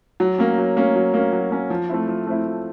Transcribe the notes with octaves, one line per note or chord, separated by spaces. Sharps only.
F#3
A#3 C#4
F#3
A#3 C#4
F#3
A#3 C#4
F#3
A#3 C#4
F3
A3 C4 E4
F3
A3 C4 E4
F3